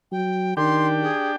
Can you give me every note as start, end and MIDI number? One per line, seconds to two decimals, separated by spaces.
0.12 0.54 54
0.12 0.54 79
0.57 1.09 51
0.57 1.36 62
0.57 1.36 67
0.57 1.36 79
0.57 0.87 84
1.02 1.31 68